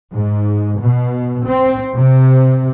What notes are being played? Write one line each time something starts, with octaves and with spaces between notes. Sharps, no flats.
G#2
B2
C4
C3